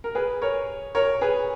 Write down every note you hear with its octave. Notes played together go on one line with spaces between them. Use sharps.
A#4
G#4 B4
A#4 C#5
A#4 C#5
G#4 B4